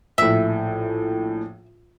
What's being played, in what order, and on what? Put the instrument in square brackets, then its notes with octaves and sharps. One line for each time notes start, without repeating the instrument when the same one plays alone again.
[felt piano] A#1 A2 [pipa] E5